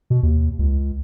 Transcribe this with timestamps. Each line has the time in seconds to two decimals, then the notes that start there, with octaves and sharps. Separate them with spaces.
0.10 B2
0.23 D#2
0.59 C#2